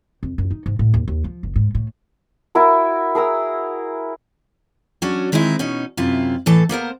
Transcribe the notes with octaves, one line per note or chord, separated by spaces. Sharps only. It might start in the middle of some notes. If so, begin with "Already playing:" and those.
F2
F#2
D#4
G#2
A2
D#2
D#2
F3
F#1
G#2
A2
E4 F#4 A#4
G#4 A#4 A#5 E6
F#3 C#4 D4 F#4
D#3 G#3 C4 D#4 E4
B2 C#4 D#4
F#2 C3 E4 F4
A2 E3 A4 A5
A#3 B3 A#4 C5